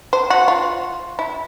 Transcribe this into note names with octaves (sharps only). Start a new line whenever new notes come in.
C5
F#4
F4
E4